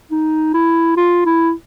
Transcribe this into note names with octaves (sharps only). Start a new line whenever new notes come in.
D#4
E4
F4
E4